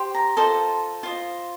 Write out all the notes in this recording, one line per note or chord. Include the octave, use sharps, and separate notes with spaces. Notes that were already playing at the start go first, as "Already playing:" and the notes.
Already playing: G4 C5
A#5
F4 A4 C5 D#5
F4 C5 D#5